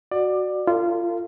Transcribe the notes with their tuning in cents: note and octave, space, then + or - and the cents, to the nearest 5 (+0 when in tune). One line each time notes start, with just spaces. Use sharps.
F#4 +0 D5 +20
F4 -20 A4 +45